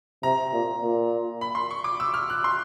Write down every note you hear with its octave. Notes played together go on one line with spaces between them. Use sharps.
C3 A#5
A#2
A#2
B5
C6
C#6
D6
E6
F6
F#6
C6